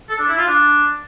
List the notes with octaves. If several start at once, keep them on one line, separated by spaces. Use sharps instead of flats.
A4
D4
E4
F4
D4